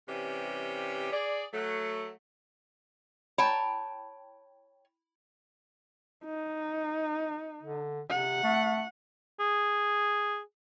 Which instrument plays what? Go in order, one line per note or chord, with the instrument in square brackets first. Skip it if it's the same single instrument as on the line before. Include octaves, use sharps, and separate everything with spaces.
[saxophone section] C3 E3 G3 C#4 G4
G#4 D5
F#3 A3
[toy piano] E4 B5 [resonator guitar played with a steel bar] C#5 G5 A5
[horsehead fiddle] D#4
[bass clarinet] D3
[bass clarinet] C3 [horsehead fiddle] F#5
[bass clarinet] A3
[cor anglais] G#4